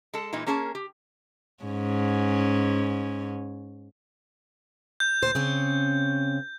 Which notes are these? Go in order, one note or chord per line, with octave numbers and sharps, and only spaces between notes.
G#3 A4
A#2 E3 G#3 D#4
A#3 C#4 G#4 A#4 C#5 A5
G4
G#2 C#4
G6
D2 A#2 C5
C#3 C4 C#4